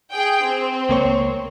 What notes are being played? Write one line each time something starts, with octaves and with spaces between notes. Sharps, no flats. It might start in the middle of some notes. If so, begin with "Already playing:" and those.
G#4 G5
C4
C#2 A#3 C#5